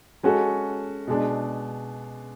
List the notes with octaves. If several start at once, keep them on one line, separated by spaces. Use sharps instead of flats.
G#3 C#4 F#4 A4
B2 G#3 D4